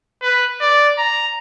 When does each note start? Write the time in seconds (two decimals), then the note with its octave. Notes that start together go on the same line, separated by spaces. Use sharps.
0.22 B4
0.61 D5
0.98 A#5